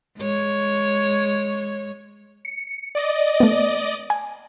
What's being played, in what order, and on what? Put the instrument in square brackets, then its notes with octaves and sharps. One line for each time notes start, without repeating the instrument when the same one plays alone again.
[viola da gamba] G#3 C#5
[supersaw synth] C#7
D5 D#5
[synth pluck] A3 B3
G#5